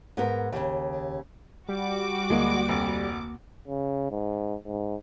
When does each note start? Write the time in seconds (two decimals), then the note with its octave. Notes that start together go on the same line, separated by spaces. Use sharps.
0.17 G#2 B3 A#4
0.52 D#2 C#3
1.69 G3 F#4 D6
2.30 D2 G#3 A#3
2.68 F1
3.68 C#3
4.11 G#2
4.66 G#2